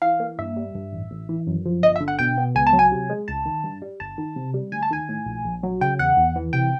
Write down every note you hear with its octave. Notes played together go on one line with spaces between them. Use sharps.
E3 F5
A#3
G2 E5
G3
G2
A1
A1
E3
F#2
F3
G1 D#5
E5
D3
F#5
B2 G5
B3
C#2 G#5
A5
F#3
G#5
C3
G#3
C#2 A5
D#3
G2
G3
G1 A5
D#3
C3
G3
D2 G#5
A5
D#3 G#5
A2
A#1
A#1
F#3
C#3 G5
E2 F#5
E2
E3
C3 G5